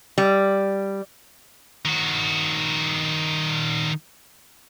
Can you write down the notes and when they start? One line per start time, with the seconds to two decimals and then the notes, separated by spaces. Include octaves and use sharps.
0.18 G3
1.85 D#3 F#4